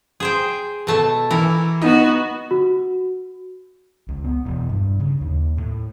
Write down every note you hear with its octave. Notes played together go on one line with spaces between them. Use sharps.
G#4 C5 G5
B2 A3 A5
E3 E4 A#4
B3 D#4 F#4
F#4
C#2
B3
E1
G2
C#3
D#2
A2